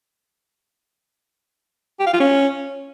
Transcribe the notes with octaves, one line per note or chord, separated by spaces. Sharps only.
G4
F5
F4
C#4